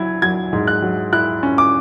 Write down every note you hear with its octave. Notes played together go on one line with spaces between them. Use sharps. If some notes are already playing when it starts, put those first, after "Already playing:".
Already playing: F#3 E4 G#6
F#3 G#6
G#2
F#6
F#3
E4 F#6
C#4
D6